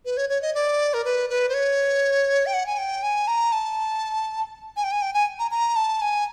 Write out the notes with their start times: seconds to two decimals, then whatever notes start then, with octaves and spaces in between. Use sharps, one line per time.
0.05 B4
0.17 C#5
0.29 C#5
0.42 D#5
0.55 D5
0.94 A#4
1.05 B4
1.30 B4
1.49 C5
1.54 C#5
2.46 G5
2.54 F#5
2.66 G#5
2.78 G5
3.03 G#5
3.28 A#5
3.52 A5
4.77 G#5
4.84 G5
4.92 G#5
5.02 G5
5.14 G#5
5.39 A#5
5.51 A#5
5.76 A5
6.02 G#5